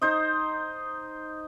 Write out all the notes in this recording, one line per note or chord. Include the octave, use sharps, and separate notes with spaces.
D#4 C5 D#5